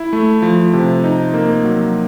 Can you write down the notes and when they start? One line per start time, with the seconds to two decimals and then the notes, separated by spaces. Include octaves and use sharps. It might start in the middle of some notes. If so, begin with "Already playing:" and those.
Already playing: E4
0.13 A3
0.42 F3
0.73 C3
1.04 D#4
1.34 A#3
1.64 F#3